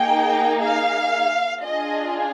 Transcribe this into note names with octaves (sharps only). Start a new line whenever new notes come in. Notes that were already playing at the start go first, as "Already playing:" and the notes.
Already playing: A#3 D#4 G#4 G5
F5
D4 F4 G#4 D#5